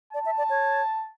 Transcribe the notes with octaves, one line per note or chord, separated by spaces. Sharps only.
D5 A5
E5
D5
C#5